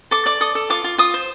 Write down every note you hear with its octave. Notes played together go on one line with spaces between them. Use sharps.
A4 D6
D5 D6
A4 D#6
A4
F4 D6
F4
F4 D#6
C5